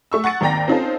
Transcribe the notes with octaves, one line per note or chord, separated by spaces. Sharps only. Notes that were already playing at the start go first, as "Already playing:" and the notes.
A3 C#6 E6
F#5 C#6 A6 C#7
G#1 D#2 D5 G5 A#5 A#6
C4 C#4 D#4 F4 A4 C5